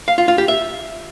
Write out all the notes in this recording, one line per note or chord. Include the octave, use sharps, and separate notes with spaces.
F5
F4
F4
G4
E5